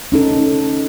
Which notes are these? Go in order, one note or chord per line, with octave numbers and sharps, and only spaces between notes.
C#4 D#4 A4